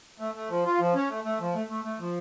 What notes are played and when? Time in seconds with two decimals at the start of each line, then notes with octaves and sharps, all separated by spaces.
0.20 A3
0.35 A3
0.50 F3
0.65 F4
0.80 F3
0.95 C#4
1.10 A3
1.24 A3
1.40 F3
1.55 A3
1.70 A3
1.85 A3
2.00 F3